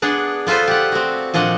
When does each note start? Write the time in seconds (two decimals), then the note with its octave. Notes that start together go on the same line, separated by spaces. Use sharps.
0.02 B3 D4 G#4 F#5
0.47 B3 F4 A4 B4 C5
0.68 G4 F#5
0.92 C4 F#4
1.34 A#2 F3 D4 D#5 F#5